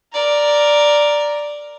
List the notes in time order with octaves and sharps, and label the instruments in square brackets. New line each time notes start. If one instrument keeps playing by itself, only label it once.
[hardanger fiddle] A#4 D5